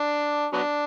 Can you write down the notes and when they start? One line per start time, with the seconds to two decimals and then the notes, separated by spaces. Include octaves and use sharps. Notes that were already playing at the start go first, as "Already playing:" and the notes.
Already playing: D4
0.53 F#3 B3 D4